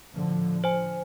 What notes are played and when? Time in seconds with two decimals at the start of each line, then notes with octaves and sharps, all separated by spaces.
0.13 A2 D3 F3
0.64 C5 G#5